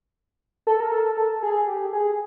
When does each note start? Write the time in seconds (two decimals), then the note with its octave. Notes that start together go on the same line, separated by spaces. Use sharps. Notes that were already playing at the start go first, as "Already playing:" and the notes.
0.67 A4
0.80 A#4
0.92 A4
1.17 A4
1.43 G#4
1.68 G4
1.93 G#4